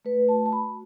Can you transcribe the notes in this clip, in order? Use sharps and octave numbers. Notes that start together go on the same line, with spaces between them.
A3 B4
F#4 A5
A5
F#4 B5